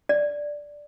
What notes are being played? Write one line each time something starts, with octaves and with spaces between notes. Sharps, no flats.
D5